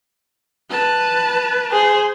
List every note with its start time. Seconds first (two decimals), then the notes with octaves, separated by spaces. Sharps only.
0.70 B4 A5
1.72 G#4 C5